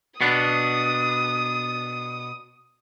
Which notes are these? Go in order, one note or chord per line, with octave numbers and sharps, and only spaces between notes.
B2 B3 D4 D#6